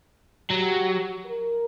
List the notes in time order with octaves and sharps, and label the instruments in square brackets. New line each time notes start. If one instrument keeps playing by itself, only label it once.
[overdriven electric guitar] F#3 [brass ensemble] G4
[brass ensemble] A#4